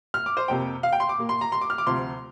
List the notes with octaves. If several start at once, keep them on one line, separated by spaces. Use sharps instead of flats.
F6
D6
C5
F2 C3 A#3 G5
F5
G5
C6
D6
A#2 A#3
C6
A#5
C6
D6
F6
D6
D2 C3 F3 C6